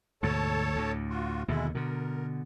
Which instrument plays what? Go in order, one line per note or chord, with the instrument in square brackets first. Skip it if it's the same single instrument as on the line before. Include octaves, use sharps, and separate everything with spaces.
[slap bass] D2 G#2 B2 [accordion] A4 C#5 A5
[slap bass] D2 A2
[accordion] F4 F#4
[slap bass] D#2 B2 D3 [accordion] G#3 E4
[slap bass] B2 D3 [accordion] A#4